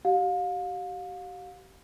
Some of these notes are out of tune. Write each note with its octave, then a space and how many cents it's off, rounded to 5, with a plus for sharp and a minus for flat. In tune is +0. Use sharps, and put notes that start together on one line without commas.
G4 -40 F5 +35